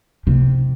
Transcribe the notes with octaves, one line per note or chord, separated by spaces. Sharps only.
C3